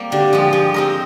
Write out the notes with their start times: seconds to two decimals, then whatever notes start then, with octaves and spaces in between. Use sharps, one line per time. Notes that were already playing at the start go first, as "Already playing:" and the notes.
Already playing: G3 A#3 C4
0.11 D3 G4
0.33 F3 G#3
0.53 F3 G4
0.74 C4 D#4 A#4